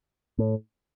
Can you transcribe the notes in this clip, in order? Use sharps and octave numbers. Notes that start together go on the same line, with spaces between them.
A2